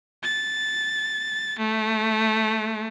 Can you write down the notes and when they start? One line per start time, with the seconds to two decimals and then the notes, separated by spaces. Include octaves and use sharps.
0.23 A6
1.58 A3